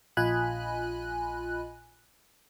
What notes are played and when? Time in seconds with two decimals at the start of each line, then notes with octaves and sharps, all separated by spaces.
0.17 A#1 F4 D#5 G#5 B5 F#6